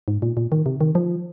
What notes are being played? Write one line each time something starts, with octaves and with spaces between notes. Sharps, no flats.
G#2
A#2
A#2
D#3
C3
D#3
F3